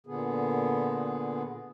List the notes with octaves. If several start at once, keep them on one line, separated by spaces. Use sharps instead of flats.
A#2 D3 B3 G#4